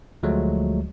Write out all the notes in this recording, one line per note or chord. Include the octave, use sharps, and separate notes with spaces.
D2 F3 F#3 G#3 A3